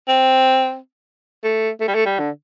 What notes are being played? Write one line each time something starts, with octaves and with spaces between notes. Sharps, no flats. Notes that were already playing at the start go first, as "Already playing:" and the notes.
C4
A3
A3
G3
A3
G3
D3